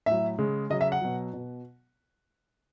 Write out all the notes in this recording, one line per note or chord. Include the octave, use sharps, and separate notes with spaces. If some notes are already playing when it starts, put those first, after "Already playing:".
A2 F#3 E5
C#3 G#3
C#3 F#3 D#5
E5
F#5
B2 F#3
B2